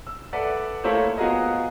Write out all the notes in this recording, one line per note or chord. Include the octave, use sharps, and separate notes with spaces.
E6
A4 B4 D5 E5 F#5
A3 A#3 E4 A4 C5 C#5
B3 F4 F#4 G#4 A#4 D#5